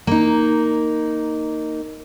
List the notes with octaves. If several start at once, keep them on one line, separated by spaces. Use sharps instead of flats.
A#3 D#4